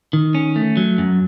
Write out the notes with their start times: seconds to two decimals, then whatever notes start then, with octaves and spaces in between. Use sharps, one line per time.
0.13 D#3
0.35 C#4
0.56 A3
0.77 F#3
0.98 F#2